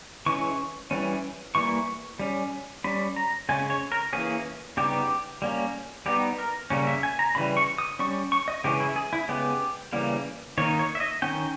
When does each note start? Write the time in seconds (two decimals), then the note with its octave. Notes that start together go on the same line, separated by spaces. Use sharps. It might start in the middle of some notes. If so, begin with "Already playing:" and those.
0.26 E3 G#3 C#4 C#6
0.91 E3 G3 C#4
1.55 E3 G3 A#3 C#6
2.19 G3 C#4
2.84 G3 C#4 B5
3.16 A#5
3.49 C#3 G#3 C#4 G#5
3.70 C#5
3.92 A#4
4.13 E3 A#3 C#4 G#4
4.77 C#3 G3 B3 D#4 G4
5.42 G3 A#3 C#4
6.06 G3 B3 D#4 G4
6.38 A#4
6.70 C#3 G3 A#3 C#4
6.87 E5
7.03 G#5
7.19 A#5
7.35 C#3 E3 G3 B5
7.57 C#6
7.78 D#6
7.99 G3 C#4 C#6
8.32 C#6
8.48 D#5
8.64 C#3 E3 G#3 C#4 G4
8.80 E4
8.96 G#4
9.13 E4
9.28 C#3 G#3 B3 G4
9.93 C#3 E3 G3 A#3
10.58 D#3 A#3 D#4 C#5
10.79 C#5
10.95 E5
11.00 D#5
11.22 D#3 A#3 C#4 G5